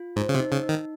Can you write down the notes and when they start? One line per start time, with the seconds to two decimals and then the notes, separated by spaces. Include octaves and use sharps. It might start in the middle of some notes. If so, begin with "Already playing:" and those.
Already playing: F4
0.16 G#2 C5
0.29 C#3
0.35 C3
0.40 D#4
0.52 C#3
0.63 D#4
0.69 D#3